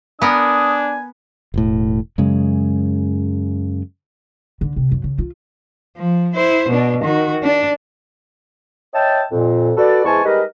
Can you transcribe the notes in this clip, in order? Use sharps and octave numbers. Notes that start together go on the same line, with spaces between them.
B3 D4 A#4 G#5 D#6
E1 A2
F#2 C#3 G#3
D3
C3
F#2
C#3
F4
F3
E4 C5
B2 D4
D#3 F#4
D4
C#5 D#5 E5 G5 A5
F2 A#2
F#4 A4 B4 D5
E2 G#3 C5 G#5 A5 C#6
G3 G#3 D#4 A#4 B4 D#5